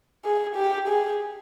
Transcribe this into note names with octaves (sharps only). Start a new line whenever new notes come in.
G#4
G4
G#4